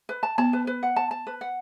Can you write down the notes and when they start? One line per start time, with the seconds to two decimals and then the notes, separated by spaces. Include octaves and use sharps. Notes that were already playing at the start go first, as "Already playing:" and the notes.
0.09 B4
0.23 A5
0.38 B3 A5
0.53 B4
0.67 B4
0.83 F#5
0.96 A5
1.11 A5
1.27 B4
1.41 F#5